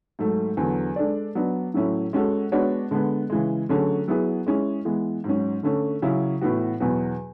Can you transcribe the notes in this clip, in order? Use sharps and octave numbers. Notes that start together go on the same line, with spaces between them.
G#2 F#3 A3
E2 D3 F#3
G#3 D4 A4 D5
F#3 B3 D4
A2 F#3 A3 C#4 E4
G#3 C#4 F#4 A4
G#3 B3 D4 F#4 C#5
D3 G#3 B3
C#3 E3 G#3
D3 F#3 A3 C#4 G#4
F#3 B3 E4 G#4
G#3 C#4 E4 G#4
E3 G#3 B3
G#2 F#3 C#4
D3 A3 C#4
C#3 F#3 C#4 E4
A2 E3 B3 F#4
E2 B2 F#3 B3 F#4